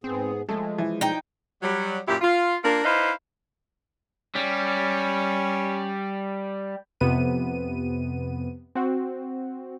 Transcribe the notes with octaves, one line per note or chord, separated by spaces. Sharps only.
G#2 B3 C4 G#4
F3 G#3 A3
E3
D#4 G5
F#3 G3
F#2 A#2 E4 G4
F4
A#3 D4 F4 A#4
D#4 E4 B4 C5 D#5 F5
G3 C#4
F2 C3 B3 D#7
C4 F#4